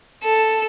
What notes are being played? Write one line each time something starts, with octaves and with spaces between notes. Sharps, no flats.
A4